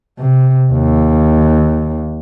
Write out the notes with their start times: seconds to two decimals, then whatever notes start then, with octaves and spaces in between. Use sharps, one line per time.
0.18 C3
0.72 D#2